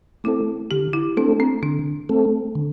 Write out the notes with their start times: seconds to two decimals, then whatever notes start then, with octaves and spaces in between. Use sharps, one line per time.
0.24 A3 C4 E4 A4
0.71 D3 G4
0.93 E4
1.17 A3 C4 D4 A4
1.40 C4
1.63 D3 D4
2.09 A3 C4 A4
2.55 D3